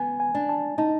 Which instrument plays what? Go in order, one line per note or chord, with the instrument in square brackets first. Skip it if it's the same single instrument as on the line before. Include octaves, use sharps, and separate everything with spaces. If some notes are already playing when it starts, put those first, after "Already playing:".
Already playing: [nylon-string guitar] B3 [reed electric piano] G#5
[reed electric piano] G#5
[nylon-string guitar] D4
[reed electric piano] A5
[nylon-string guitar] D#4 [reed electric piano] A5